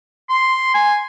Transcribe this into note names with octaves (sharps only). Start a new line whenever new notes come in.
C6
G#5